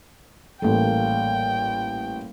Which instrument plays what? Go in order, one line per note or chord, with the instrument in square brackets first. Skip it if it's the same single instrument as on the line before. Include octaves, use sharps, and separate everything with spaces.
[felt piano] A1 A4 [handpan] G3 A#3 [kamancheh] G5